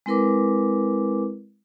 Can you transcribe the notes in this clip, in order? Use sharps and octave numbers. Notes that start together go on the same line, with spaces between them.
G#3 C4 E4 A#4 B4 D6